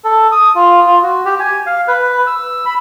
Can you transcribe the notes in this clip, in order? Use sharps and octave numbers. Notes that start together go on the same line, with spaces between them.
A4
D#6
F4
F4
F#4
G4
G#5
F5
B4
E6
B5